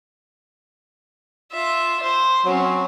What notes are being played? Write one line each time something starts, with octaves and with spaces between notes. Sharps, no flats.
F4 E5
C5
F#3 C4 C#4